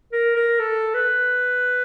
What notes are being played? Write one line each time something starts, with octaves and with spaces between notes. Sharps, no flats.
A#4
A#4
A4
B4